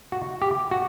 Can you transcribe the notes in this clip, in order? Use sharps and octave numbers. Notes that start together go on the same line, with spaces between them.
F#4
G4
F#4